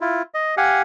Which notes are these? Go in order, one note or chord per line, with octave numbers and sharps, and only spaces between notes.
E4 F4
D#5
G4 F5 F#5 G#5